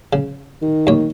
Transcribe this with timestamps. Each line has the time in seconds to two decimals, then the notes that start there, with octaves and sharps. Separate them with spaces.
0.13 C#3
0.62 D#3
0.87 D#2 C#5